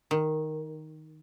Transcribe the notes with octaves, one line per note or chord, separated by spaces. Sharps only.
D#3